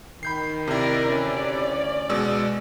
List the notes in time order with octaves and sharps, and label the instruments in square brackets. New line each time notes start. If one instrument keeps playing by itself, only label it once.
[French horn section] D#3 [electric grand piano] B5 G6 C7
[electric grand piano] C3 E4 [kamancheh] A#4 D5
[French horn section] D2 C#4 [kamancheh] D5
[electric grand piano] B2 G#3 E6